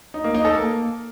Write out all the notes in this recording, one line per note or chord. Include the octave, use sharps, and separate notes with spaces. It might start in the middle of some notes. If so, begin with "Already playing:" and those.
D#4
A#3
D#4
A4
A#3